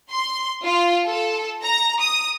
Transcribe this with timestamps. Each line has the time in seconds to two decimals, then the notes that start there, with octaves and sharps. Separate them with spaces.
0.12 C6
0.64 F4
1.08 A4
1.63 A#5
2.01 D#6